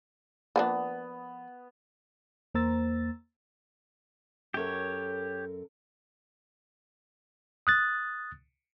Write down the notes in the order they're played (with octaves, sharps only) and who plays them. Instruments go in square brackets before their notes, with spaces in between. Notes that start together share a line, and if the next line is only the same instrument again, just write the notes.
[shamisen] F3 A#3 D4 [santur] B3
[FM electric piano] E2 A#3 C5 A#5 E6 A6
[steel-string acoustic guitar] F#2 A4 A#4 [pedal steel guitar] G4 C#5
[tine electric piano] D#6 F#6 A6